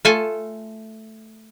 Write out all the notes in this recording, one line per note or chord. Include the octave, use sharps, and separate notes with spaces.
A3 F4 A4 G#5 A5